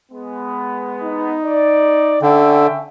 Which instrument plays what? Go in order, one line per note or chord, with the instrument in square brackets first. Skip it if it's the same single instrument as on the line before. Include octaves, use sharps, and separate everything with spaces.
[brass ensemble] G#3 B3
[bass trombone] D#4
[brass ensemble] D5
[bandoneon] D3 [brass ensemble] C#4 E5 G5